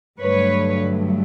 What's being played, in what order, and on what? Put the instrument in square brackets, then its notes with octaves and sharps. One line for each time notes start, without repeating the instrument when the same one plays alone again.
[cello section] G2 D3 F#3 A3 B4 C#5